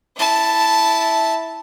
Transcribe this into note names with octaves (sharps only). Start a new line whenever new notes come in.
E4 A5